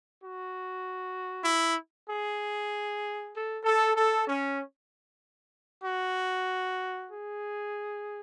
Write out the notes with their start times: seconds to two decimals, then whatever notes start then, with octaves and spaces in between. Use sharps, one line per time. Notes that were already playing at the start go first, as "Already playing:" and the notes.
0.20 F#4
1.45 E4
2.08 G#4
3.32 A4
3.64 A4
3.96 A4
4.27 C#4
5.83 F#4
7.08 G#4